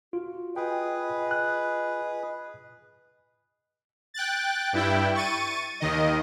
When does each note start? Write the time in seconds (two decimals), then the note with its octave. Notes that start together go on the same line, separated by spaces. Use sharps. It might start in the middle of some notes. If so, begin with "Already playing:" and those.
0.13 F4 F#4
0.56 G#4 B4 D#5 G5
1.31 F#6
4.14 G5 F#6 A6
4.73 G2 E4 G5
5.15 C#6 A6 D#7
5.80 D#2 D#3 D#5